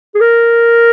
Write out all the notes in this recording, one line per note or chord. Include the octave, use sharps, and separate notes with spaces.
G#4
A#4